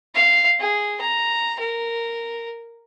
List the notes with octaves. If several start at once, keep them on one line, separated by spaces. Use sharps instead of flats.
F5
G#4
A#5
A#4